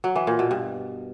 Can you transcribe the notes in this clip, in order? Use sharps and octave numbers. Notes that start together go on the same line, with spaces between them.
F#3
E3
A#2
B2
G2